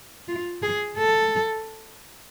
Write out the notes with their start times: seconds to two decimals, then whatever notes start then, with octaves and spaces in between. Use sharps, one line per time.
0.28 F4
0.62 G#4
0.98 A4